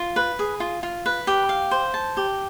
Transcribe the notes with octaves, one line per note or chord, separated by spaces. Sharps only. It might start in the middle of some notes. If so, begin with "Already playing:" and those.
Already playing: F4
B4
G#4
F4
F4
B4
G4
F5
C5
A5
G4